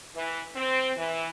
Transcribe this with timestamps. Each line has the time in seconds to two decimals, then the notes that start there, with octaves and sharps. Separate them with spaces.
0.14 E3
0.55 C4
0.96 E3